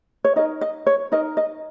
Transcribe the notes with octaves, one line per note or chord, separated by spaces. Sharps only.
C#5
D#4 A#4 D#5
D#5
C#5
D#4 A#4 D#5
D#5